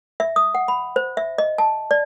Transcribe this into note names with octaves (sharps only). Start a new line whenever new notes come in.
E5
D#6
F#5
B5
C5
E5
D#5
A5
D5